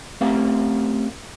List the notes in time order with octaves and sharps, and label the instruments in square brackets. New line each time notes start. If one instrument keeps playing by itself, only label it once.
[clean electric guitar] A3 C4 C#4 G4 A#4 F5